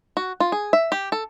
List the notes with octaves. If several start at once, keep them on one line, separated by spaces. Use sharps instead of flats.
F#4
F4
G#4
E5
G4
A4